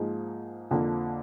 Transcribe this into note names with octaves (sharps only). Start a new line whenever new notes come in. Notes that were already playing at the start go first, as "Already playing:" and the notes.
Already playing: G#2 F3 A#3 D#4 G#4
F2 D3 F3 A#3